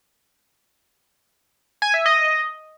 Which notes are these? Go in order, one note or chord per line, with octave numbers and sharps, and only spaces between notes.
G#5
E5
D#5